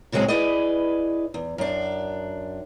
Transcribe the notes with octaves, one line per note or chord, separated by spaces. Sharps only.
A2 C#3 F#3 G#3 C4 G#4
E4 G#4 B4 D5 D#5
E2
F#2 D4